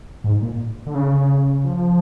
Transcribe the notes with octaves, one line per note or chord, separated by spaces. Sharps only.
G#2
A#2
D3
C#3
F3